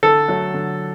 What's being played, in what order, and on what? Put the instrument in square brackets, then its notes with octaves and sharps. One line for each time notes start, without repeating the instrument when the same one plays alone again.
[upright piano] D3 [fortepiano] A4
[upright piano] F#3 A3
D3